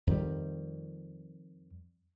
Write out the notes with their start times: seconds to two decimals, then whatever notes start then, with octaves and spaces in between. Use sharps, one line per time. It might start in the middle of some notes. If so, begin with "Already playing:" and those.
0.07 F2 D#3 G3